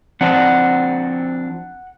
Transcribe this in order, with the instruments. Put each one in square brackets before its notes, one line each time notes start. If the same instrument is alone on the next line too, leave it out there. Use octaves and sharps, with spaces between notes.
[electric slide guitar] F3 C4 D4 [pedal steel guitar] F#5 A#5